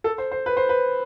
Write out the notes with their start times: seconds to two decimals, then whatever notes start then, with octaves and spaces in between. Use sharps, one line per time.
0.04 A4
0.18 C5
0.32 C5
0.46 B4
0.57 C5
0.69 B4